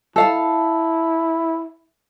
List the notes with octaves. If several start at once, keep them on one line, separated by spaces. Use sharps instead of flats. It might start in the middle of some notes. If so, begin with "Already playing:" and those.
E4 A4 F5 A5